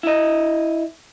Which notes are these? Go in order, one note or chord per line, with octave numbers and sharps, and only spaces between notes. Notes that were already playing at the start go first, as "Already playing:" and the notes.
E4 D#5